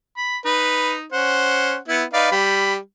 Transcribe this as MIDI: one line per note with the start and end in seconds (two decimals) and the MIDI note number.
0.17 0.37 83
0.45 1.06 63
0.45 0.93 71
1.13 1.76 61
1.13 1.76 72
1.13 1.77 78
1.88 2.04 59
1.88 2.04 64
2.13 2.30 63
2.13 2.30 71
2.13 2.31 74
2.13 2.30 77
2.32 2.77 55
2.32 2.73 83